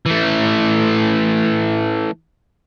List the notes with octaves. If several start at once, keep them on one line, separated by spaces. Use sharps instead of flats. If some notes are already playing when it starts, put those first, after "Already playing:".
E3 A3